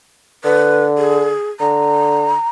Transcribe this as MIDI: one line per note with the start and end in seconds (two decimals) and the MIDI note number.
0.44 1.32 50
0.44 0.85 71
0.98 1.50 68
1.60 2.34 50
1.60 2.48 82